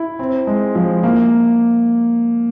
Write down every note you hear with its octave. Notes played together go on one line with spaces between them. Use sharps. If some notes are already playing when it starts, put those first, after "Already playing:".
Already playing: E4
C4
G#3
F3
A#3